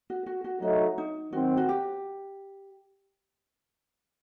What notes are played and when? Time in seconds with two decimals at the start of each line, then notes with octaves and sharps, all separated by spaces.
0.10 F#4
0.26 F#4
0.44 F#4
0.62 F#3 A3 D#4 F#4
0.98 D#4
1.33 D#3 F#3 C4 F#4
1.57 F#4
1.69 G4